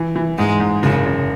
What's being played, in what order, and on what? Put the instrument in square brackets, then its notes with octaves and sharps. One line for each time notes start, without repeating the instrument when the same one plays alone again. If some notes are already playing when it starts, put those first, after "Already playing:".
Already playing: [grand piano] E3
E3
[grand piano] G#2 [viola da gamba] G#3
[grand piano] G#2
[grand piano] F#1 [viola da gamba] C#3
[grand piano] F#1